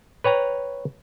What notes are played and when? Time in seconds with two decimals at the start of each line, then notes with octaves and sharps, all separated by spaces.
0.24 B4 C#5 G5 A#5